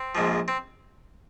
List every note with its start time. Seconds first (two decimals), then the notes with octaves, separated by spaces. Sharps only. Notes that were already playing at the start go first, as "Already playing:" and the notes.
Already playing: C4
0.15 A#1 G#2 F3
0.48 C4